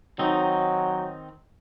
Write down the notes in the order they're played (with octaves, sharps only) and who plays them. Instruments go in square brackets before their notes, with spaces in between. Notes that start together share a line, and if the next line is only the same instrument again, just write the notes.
[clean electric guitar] D#3 C4 D#4 [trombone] F#3